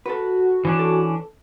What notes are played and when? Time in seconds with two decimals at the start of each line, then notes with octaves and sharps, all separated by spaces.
0.06 F#4 A4 B4
0.65 E3 C#4 D4
0.79 A4